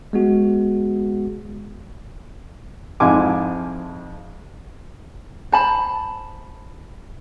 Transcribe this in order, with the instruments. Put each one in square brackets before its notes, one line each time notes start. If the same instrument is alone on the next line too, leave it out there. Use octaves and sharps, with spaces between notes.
[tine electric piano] G#3 B3 F#4
[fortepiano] F2 G#2 F3 E4 G#5 D6
[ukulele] C5 A5 B5